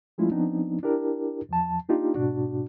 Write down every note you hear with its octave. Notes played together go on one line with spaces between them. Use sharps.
F3 G#3 A3 C#4 E4 F4
F3 B3 C4 D4 D#4
D4 E4 G4 A#4
E2 F3 A5
A#3 D4 D#4 F4 G4
G#2 B2 D4 F#4